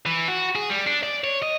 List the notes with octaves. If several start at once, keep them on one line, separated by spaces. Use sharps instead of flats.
E3
F#4
G#4
G3
D4
D5
C#5
D#5